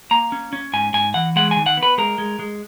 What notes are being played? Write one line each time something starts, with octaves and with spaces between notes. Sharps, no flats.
A#3 A#5
C#4
C#4
G#2 G#5
G#2 G#5
E3 F#5
G#3 F#5
G#5
D#3
F#5
B3
B4
G#3 A#4
G#3
G#3